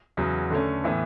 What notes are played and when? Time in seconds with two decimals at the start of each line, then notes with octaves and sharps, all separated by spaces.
0.17 E2 C#3 F#3
0.50 D3 A3 C#4
0.84 A2 E3 B3